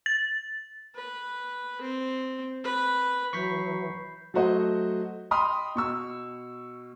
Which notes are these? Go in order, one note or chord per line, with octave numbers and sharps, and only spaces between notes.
A6
B4
C4
B4
E3 F#3 B5 C#6 G6 B6 C7
F#3 A3 F#4 C5 D#5
D#5 G5 B5 C6 D#6 F6
B2 C#6 E6